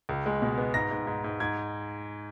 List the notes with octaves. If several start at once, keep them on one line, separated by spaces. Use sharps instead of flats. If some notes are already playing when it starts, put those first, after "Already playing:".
C#2
G#3
B2
B3
G#2 A#6
G#2
G#2
G#2
G#2 G#6